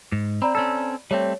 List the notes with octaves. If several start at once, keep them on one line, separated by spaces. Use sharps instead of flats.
G#2
C4 D5 A#5 B5
C4 C#4 A4
G3 A3 C4 C#5